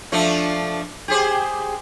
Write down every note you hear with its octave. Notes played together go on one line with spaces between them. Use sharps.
F3 A3 D4
G4 G#4 C5